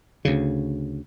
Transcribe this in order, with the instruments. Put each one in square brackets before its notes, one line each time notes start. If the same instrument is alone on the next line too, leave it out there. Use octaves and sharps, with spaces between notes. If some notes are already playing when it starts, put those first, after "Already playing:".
[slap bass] D2 C#3